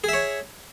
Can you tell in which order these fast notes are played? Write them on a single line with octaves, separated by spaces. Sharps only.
G#4 E5 C#5